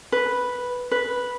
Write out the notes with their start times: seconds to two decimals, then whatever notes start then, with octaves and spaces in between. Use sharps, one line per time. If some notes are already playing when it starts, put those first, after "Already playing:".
0.12 B4
0.91 B4